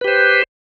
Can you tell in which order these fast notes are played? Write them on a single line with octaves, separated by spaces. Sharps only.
B4 G4 C5